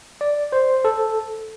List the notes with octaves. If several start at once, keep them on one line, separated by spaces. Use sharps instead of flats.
D5
C5
A4